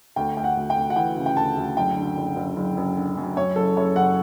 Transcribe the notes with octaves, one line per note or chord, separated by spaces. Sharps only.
D2 G5
D2 G5
F#5
D2
G5
D2
F#5
E3 G5
C#3
G5
D2 A5
D2
F#1 G5
D3
F#1
F#1
F#1
F#1
D3
F#2
F#2 C#5
F#1 A4
F#1 C#5
F#1 F#5